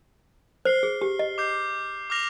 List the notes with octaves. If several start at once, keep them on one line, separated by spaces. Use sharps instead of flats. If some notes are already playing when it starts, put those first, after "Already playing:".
C5 F6 C7 G7
G#4
G4
D#5
D6 G6 C7
D6 F6 A#6 F7